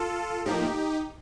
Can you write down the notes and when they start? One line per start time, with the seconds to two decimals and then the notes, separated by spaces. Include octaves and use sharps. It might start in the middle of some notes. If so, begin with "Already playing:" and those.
Already playing: F4 A4
0.46 A2 F3 A#3 D#4 G4